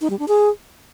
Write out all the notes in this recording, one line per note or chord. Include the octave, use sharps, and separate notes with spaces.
D#4
G3
D4
G#4